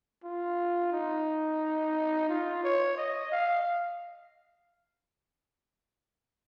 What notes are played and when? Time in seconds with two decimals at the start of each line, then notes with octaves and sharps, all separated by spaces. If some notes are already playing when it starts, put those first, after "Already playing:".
0.24 F4
0.93 D#4
2.29 F4
2.64 C#5
2.98 D#5
3.32 F5